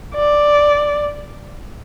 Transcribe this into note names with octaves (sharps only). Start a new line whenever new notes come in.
D5